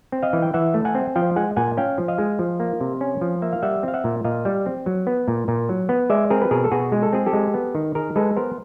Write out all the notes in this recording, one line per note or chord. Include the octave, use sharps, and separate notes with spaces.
C4
D#5 F5
E3
G5
E3 E5 F#5
A3
F#5 G#5
C4
F3 F5 G5
G#3 F#5 G#5
A#2 F#5 G#5
C#4 F5 G5
F3
D#5 F5
G#3
F3
A#3
C3
C#4
F3
A#3 E5
F5
G3 E5 F#5
C4 F5
E5 F#5
A#2
A#2 D#5 F5
G3
C4
F#3
B3
A#2
A#2
F#3
B3
G#3 D5 E5
C4 G#4 A#4
B4
B2 G#4 A#4
A4
B2 F#4 G#4
G#3
A4
C4 G#4
G4 A4
G#3
B3
D#3
D#3 G#4 A#4
G#3 A4 B4
B3 A#4 C5